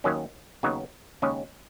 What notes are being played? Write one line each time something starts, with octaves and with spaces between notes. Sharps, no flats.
D#2 D#3 F#3 C#4
D#2 C#3 F#3 B3 D#4
D#2 C#3 G#3 C#4